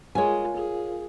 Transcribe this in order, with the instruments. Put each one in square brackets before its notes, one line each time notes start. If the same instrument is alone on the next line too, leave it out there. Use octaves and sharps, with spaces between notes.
[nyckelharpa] G#3 [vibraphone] F4 A#4 F5 [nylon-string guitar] C#5 G#5
[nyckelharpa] G#4